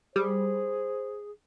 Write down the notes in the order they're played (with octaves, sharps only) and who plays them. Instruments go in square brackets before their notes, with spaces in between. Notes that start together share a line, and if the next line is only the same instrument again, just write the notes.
[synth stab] G3 [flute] G#4 [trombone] C5